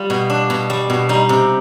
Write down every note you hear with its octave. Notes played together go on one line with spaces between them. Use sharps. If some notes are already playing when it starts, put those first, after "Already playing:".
Already playing: G3 F4
B2
D4
B2
G3
B2
G3 D#4
C3